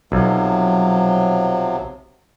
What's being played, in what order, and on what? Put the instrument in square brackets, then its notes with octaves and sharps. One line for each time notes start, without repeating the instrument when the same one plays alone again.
[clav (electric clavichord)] B1 [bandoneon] C3 F3 F#3